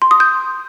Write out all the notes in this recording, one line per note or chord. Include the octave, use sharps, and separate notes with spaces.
C6
D#6
G6